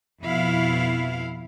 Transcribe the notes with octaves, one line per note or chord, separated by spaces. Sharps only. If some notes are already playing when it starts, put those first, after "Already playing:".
F2 B2 E4 F5